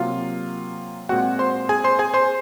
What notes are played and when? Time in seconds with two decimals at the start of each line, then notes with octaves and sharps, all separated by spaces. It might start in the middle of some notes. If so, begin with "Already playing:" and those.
Already playing: C3 F#3 A#3 F4 F5
1.09 A#2 G#3 C4 F#4 F#5
1.39 C5 C6
1.69 G#4 G#5
1.84 C5 C6
1.99 G#4 G#5
2.14 C5 C6